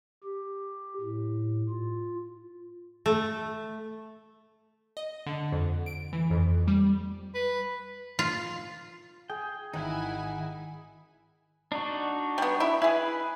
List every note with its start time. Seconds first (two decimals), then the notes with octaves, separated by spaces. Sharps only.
0.24 G4
1.01 A2
1.69 F4
3.06 A3
4.97 D#5
5.26 D3
5.52 F2
5.86 D7
6.13 E3
6.30 F2
6.68 G3
7.34 B4
8.19 F4
9.30 G#4 G5
9.73 G#1 D#3 D#4 E4 F#5 G#5
11.72 D4 D#4 F#4
12.38 G3 B3
12.60 E4 E5
12.82 E4 G#4 B4